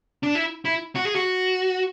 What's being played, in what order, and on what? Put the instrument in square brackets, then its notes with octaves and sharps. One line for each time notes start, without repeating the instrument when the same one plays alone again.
[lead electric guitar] D4
E4
E4
F#4
G#4
F#4